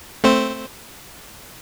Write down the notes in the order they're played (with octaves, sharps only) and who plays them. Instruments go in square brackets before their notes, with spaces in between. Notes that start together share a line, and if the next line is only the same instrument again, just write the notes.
[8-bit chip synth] A3 C4 C5